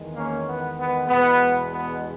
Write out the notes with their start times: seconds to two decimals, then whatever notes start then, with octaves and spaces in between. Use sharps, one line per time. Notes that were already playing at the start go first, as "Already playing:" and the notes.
Already playing: E2 D#3 G#3
0.14 A#3 C#4
0.45 B3
0.76 B3
1.08 E2 B2 G#3 B3
1.70 B3